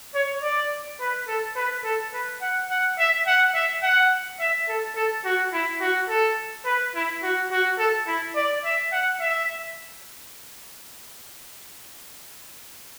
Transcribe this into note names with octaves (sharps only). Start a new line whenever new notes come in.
C#5
D5
B4
A4
B4
A4
B4
F#5
F#5
E5
F#5
E5
F#5
E5
A4
A4
F#4
E4
F#4
A4
B4
E4
F#4
F#4
A4
E4
D5
E5
F#5
E5